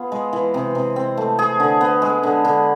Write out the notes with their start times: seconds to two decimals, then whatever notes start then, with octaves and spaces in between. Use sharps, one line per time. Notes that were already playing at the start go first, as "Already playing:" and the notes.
Already playing: B3 F4 G#4
0.12 G#3
0.33 E3
0.54 C3
0.75 C3
0.96 C4
1.17 A3
1.39 G#4
1.60 D3
1.81 B3
2.02 G#3
2.23 D3
2.45 D3